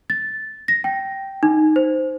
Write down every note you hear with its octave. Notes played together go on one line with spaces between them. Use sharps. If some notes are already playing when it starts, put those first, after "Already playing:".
A6
A#6
G5
D#4
C5